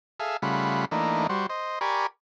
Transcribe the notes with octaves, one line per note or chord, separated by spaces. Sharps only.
G#4 A4 E5 F5
C#3 G3 A3 F4 F#5 B5
E3 A3 A#3 D4 D#4
G3 F#4 C5
C5 D#5
G4 A#4 D5 G#5 B5 C#6